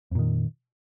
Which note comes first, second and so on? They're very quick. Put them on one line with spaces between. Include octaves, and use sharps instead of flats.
F2 A#2 D#3